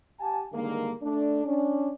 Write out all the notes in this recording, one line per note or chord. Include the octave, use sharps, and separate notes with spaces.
G4 F#5 G#5 A5
G2 D3 D#3 G#3 A#3
A3 D4
C#4 D4